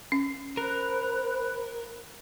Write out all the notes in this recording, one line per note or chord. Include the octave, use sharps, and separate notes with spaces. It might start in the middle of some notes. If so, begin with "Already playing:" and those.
C#4
A#4 C5 B5 F#6